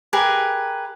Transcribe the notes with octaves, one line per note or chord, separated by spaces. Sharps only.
G4 G#4 A#4 B4